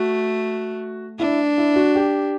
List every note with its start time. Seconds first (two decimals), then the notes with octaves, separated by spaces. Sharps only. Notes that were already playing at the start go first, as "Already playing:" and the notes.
Already playing: A3 F#4
1.19 D4 E4
1.58 E4
1.76 F#4
1.95 G4